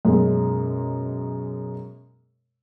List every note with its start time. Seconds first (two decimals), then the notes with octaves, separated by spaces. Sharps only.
0.05 F#2 B2 G#3